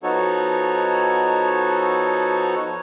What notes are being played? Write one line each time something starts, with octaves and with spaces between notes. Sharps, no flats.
F3 B3 D#4 F#4 A4 C#5